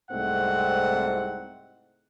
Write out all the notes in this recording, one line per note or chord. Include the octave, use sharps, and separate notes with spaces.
C2 G#2 A3 C4 F#5